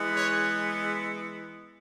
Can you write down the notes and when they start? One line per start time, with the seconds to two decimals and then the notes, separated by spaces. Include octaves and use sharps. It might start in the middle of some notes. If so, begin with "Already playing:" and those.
Already playing: E3 G#3 B3
0.14 G#4 C#5